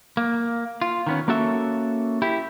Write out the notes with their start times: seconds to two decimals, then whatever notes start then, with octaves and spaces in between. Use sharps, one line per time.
0.17 A#3
0.82 F4
1.06 D#3 B3 C#4
1.28 A#3 C#4 F#4 A4 E5
2.22 E4 G4